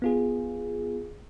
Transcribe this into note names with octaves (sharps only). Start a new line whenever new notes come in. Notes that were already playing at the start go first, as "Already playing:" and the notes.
B3 F4 G#4